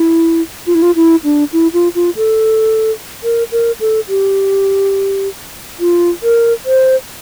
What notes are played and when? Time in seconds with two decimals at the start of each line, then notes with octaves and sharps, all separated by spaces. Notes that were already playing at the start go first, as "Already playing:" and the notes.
Already playing: E4
0.67 F4
0.75 E4
0.82 F4
0.96 E4
1.24 D4
1.53 E4
1.74 F4
1.95 F4
2.16 A4
3.24 A#4
3.52 A#4
3.80 A4
4.09 G4
5.80 F4
6.23 A#4
6.66 C5